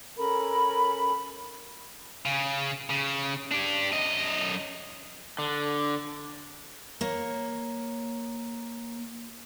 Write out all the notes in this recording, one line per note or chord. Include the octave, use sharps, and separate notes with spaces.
C#4 A4 A#4 B5
C#3
C#3
D4 G4
F#2 D#5
D3
A#3 C#5